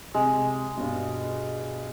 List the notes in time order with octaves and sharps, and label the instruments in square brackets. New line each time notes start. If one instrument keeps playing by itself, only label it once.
[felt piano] C3 [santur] G#3
[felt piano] G2 B2